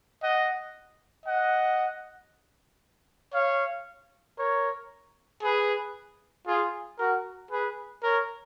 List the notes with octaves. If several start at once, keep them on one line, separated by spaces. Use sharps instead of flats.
D#5 F#5
D#5 F#5
C#5 F5
A#4 C#5
G#4 B4
F4 G#4
F#4 A#4
G#4 B4
A#4 C#5